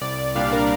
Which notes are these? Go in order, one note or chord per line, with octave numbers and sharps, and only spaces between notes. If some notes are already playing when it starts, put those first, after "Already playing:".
C2 D5
D5
A#2 G3 D4 F5
A#4